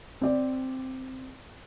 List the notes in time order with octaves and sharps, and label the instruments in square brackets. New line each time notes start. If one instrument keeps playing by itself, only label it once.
[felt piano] C4 D5